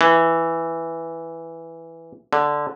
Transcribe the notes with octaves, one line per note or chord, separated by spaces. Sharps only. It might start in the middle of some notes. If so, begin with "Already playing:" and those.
E3
D3